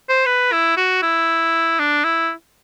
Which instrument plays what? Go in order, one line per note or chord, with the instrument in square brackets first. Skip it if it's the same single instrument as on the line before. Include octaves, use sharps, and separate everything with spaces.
[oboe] C5
B4
E4
F#4
E4
D4
E4